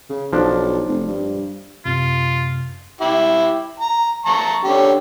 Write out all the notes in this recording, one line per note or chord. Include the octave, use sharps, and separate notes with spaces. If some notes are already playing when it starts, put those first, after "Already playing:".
C#3
B1 F3 D4
F1
G2
F#2 C3 F4
E4 G4
A#5
A5 A#5 C#6
D3 C#4 G4